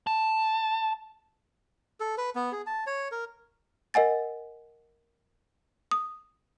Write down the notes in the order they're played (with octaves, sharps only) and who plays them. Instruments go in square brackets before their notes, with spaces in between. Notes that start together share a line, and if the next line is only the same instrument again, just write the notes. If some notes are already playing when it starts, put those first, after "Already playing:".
[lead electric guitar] A5
[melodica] A4
B4
B3
G#4
A5
C#5
A#4
[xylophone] A#4 D#5 F#5 G#5 A6
D#6